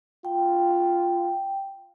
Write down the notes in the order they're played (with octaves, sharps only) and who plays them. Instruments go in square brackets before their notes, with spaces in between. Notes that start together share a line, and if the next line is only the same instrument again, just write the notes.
[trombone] F4 [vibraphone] G5